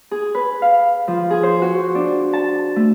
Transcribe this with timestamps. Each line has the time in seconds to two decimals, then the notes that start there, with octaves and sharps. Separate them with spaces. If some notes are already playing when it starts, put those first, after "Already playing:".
0.11 G#4
0.35 B4
0.62 F5
1.08 F3
1.30 G#4
1.43 C5
1.62 F#4
1.95 D4
2.33 A5
2.76 A3